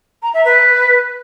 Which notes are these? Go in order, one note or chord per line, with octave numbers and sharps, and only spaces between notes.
A#5
E5
B4